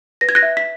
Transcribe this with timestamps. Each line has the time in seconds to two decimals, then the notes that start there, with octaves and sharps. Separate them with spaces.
0.21 B4 A#6
0.29 G#6
0.35 F#6 A#6
0.43 E5
0.57 B6